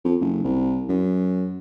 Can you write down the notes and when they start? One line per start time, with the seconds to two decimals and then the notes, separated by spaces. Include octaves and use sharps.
0.05 F2
0.21 F#1
0.44 C2
0.89 F#2